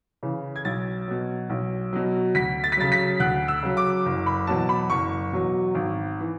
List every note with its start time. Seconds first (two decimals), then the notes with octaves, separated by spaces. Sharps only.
0.23 C#3 E3
0.56 G#6
0.65 B1 A6
1.08 B2 F#3
1.50 B1
1.93 B2 F#3
2.35 D2 B6
2.64 A6
2.72 B6
2.77 C#3 F#3 A6
2.92 B6
3.20 D2 F#6
3.48 E6
3.63 C#3 F#3
3.77 D6
4.05 F#1
4.26 B5
4.47 E2 B2 F#3 A5
4.69 B5
4.90 F#1 C#6
5.32 E2 B2 F#3
5.75 G#1
6.20 E3